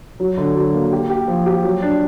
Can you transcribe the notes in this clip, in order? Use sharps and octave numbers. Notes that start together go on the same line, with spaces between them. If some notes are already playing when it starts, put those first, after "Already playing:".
F#3
D3
F#3
A#3
G4
G4
F3
G4
F#3
D4